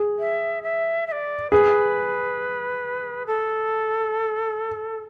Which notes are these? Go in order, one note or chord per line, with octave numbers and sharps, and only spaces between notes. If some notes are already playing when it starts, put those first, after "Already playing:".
Already playing: G#4
E5
E5
E5
D5
G#4 B4
A4